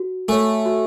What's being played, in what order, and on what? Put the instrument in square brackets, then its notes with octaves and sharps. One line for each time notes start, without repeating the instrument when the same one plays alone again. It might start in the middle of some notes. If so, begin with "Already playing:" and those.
Already playing: [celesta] F#4
[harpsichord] A3 [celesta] C#5 G#5
[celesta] F#4